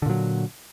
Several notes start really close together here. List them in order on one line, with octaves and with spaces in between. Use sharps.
D3 A#2 F#3